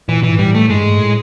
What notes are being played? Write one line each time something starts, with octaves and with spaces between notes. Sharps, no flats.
A#2 E3
E3
G#2
A2 G3
A3
G2 G#3
G#2
A2